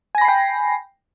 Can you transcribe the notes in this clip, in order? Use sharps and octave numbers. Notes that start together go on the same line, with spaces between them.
G5 G#5 B5 A#6 C7